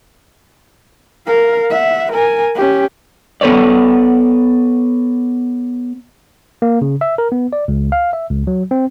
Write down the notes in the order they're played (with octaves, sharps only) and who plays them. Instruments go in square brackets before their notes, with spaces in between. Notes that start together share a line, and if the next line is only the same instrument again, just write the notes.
[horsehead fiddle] A#4 F5
E5 F#5
A#4 G#5
C#4 G4
[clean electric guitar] B3 A4 B4 C#5 D5
[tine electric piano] A#3
C#3
E5
A#4
B3
D5
C#2
F5
E5
C#2
F#3
C4